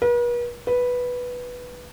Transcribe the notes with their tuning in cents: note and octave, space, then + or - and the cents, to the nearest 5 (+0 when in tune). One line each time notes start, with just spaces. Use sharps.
B4 -45
B4 -5